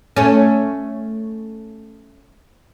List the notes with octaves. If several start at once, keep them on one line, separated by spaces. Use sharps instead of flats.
A3 C#4